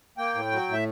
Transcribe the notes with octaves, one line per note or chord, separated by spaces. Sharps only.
A#3 G5
A2
F#3
A2 E5